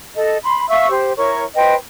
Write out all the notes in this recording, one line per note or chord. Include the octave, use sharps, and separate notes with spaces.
A4 D#5
B5 C6
E5 F5 C#6 E6
G4 C5
E4 A#4 C#5 C#6
B4 C5 D#5 G5